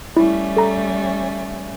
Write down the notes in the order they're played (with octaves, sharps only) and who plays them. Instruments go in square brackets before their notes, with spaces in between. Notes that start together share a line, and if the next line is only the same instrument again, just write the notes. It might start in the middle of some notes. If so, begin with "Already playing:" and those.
[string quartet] G3 A3 C#4 [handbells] E4
[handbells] A4 A#5